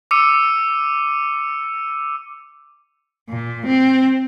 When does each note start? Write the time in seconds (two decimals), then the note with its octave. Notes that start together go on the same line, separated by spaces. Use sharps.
0.11 D6 E6 C#7 D#7
3.30 A#2
3.67 C4